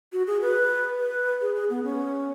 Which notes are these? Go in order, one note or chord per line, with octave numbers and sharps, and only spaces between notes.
F#4
G#4
B4
B4
G#4
G#4
B3
C#4